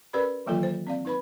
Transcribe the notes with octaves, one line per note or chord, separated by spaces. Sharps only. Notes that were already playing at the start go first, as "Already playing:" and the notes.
C#4 G4 A#4 B4 D5 B5
D#3 E3 F#3 A#3 F4 A4
C5
C4 D5 F5
D#4 B4 B5